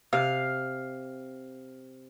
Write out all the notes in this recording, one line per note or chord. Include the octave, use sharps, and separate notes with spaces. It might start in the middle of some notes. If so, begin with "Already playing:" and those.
C3 F5